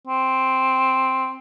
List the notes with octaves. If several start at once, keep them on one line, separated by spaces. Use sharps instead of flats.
C4